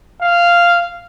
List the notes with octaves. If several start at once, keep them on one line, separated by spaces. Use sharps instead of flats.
F5